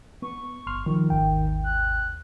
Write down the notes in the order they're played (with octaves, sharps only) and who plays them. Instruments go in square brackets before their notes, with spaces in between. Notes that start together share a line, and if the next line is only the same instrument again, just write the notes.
[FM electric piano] B3 [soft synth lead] C#6
[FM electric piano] G1 C6 F6
[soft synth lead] D#3 [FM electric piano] F3
[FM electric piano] G#1 D#2 G5
[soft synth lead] F#6